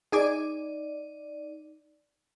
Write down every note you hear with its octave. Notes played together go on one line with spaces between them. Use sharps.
D#4 G#4 D5 G#5 D6